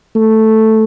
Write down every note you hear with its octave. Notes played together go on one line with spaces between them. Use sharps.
A3